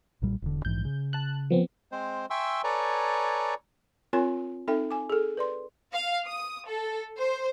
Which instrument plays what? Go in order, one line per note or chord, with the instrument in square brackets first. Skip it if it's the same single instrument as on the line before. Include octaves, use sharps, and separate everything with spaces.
[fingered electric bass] B1 A#2 G3
E1 D3
[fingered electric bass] A#1 G#2 E3 [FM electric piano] G6
[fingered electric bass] C#3
[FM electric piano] A5 F#6
F3 B3 C4
[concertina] G#3 C4 C5
E5 G5 G#5 C6 C#6 E6
A4 B4 C#5 D5 G#5 A#5
[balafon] C4 F4 A#4 C#5 G#5 C6
C4 D#4 A4 E5 G5
G#5 D6
G#4 A4
B4 D5 C6
[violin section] F5
D#6
A4
C5